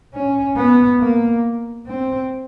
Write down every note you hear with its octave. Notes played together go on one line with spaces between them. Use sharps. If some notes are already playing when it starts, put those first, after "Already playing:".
C#4
B3
A#3
C4